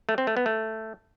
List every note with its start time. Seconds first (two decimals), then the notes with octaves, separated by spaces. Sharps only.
0.09 A3
0.18 C4
0.27 A3
0.37 B3
0.46 A3